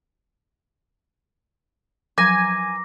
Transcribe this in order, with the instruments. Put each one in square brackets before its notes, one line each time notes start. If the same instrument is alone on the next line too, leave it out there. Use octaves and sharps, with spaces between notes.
[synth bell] F3 F#3 A#5 [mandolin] G#5 [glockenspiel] D6 A#6